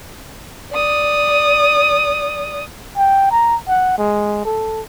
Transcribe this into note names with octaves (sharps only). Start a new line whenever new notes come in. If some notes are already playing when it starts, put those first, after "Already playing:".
D5 D#6
G5
A#5
F#5
G#3
A4